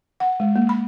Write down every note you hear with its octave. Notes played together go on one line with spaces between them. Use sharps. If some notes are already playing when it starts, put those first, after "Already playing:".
F#5
G#3
A#3
B5